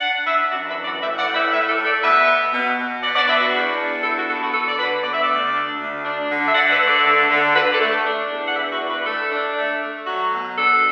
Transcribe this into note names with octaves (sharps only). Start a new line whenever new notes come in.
D4 D5 F#5
D4 B4 E5
F#2 D5 F#5
B4 E5
E3
D5 F#5
A2 B4 E5
D5 F#5
A2
B4 E5
A2 B4 E5
A4 D5
A3
A4 D5
B2 B4 E5
B3
B2
B2
B3 D5 F#5
D5 F#5
D4 B4 E5
F#4 B4
E2
D4
E4 A4
F#4
B3 A4
F#4
D3 A4
D5
D3 F#4 B4
B3 D5
E5
A4 D5
D2
D4
D2
D4
D3
E5
D3 D5 F#5
B4 E5
A3
A4 D5
D3
D3
D3 F#4 B4
A4 D5
A3
D4
E2
F#5
E3 B4 E5
F#4 B4
D4
F#4 B4
A3 A4
D4
A3
A3
F#3 F#4
B2
D4 A4